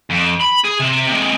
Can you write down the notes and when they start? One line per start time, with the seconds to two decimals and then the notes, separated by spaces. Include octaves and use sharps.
0.10 F2
0.40 B5
0.64 G#4
0.80 C3
1.08 C3 G#3